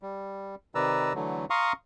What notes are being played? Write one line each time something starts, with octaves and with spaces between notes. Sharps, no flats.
G3
C3 D#3 B4 D5 A#5 E6
D3 E3 F#3 A3
F5 A#5 C6 C#6 D#6